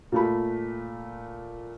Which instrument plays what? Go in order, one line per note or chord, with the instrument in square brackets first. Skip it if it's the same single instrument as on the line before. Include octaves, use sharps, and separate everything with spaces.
[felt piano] A#2 A3 B5